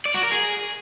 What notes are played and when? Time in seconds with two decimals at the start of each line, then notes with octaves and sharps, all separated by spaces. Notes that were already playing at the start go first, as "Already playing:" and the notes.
0.05 D5
0.14 F#4
0.23 A#4
0.32 G#4